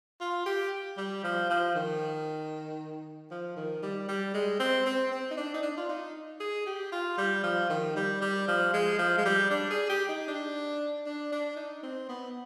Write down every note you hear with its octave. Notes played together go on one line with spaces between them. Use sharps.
F4
G4
G3
F3
F3
D#3
F3
D#3
G3
G3
G#3
C4
C4
C4
D#4
D4
D#4
D4
F4
D#4
G#4
G4
F4
G3
F3
D#3
G3
G3
F3
G#3
F3
G#3
G3
D4
G#4
G4
D#4
D4
D4
D4
D#4
C4
B3